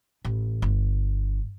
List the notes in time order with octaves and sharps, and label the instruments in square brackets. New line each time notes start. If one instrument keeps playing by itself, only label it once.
[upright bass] A1
G1